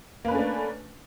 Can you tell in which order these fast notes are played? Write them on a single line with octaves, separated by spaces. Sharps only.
A#3 B4 C#4 A3 D4